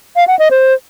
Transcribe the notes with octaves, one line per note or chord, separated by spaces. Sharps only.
F5
F#5
D#5
C5